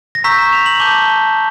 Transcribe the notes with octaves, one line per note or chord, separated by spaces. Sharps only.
A#6
A#5 C#6 E6 G6 B6
E7
F7
F#7
A5 D6 G6 G7